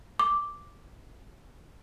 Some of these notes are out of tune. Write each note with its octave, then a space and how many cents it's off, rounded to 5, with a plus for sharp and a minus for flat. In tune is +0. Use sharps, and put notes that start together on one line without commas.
D6 -5